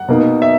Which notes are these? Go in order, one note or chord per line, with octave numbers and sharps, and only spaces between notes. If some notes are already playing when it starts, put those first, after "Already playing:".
Already playing: F#5
B2 A#3 D#4
E5